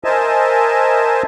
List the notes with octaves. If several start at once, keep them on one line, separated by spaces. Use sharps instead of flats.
A#4 C5 D#5 E5 G#5 A5